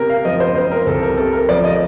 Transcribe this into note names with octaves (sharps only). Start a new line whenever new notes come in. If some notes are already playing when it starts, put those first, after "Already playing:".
Already playing: C3 A#4
F5
F3 D#5
C5
C4 C5
A#4
C2 A4
A#4
C3 A4
A#4
F3 D5
D#5